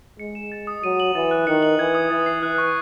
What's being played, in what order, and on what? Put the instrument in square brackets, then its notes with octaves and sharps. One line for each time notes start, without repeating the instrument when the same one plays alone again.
[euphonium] G#3 [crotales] C#7
[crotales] E7
A6
D#6
[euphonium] F#3 [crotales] D#7
[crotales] F#7
[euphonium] E3 [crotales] A6
[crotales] F#6
[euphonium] D#3 [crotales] C#7
[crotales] F#7
[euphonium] E3 [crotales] G#6
[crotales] D#6
[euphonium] E3 [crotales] A6
[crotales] C7
[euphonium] E3 [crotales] F#6
[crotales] C#6